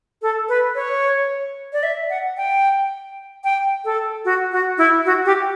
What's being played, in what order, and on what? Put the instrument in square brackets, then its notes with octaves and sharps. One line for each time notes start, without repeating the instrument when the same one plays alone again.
[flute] A4
B4
C#5
D5
E5
F#5
G5
G5
A4
F#4
F#4
E4
F#4
G4